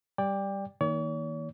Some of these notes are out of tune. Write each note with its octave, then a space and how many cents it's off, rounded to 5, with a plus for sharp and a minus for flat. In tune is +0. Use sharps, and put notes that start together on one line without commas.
G3 +0 D5 +0 G5 +25
D#3 +25 A#3 +0 C#5 +45